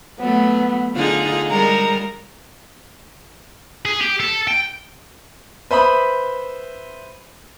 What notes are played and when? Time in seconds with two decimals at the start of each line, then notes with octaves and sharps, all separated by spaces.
0.19 F#3 A3 B3
0.94 D3 D#4 F4 G#4
1.50 G3 G#3 A#4 A#5
3.85 G#4
4.01 G4
4.20 A4
4.47 G5
5.71 B4 C5 E5 B5 D#6